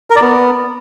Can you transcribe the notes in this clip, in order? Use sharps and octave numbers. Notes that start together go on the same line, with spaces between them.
A#4
D5
B3